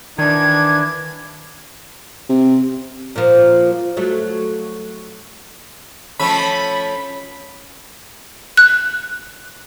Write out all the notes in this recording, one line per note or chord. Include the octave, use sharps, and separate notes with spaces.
D#3 E3 D4 G#6
C3
A#2 F3
F#3 A3
F3 A3 C#4 B5
F#6